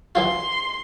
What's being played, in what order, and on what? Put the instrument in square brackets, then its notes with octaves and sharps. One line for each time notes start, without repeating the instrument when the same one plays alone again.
[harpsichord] E3 F#3 F4 [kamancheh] C6